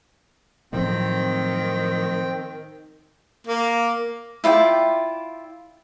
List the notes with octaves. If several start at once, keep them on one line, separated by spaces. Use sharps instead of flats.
F2 A2 D#3 F#3 A3 C4 G5
A#3
E4 F4 D5 G5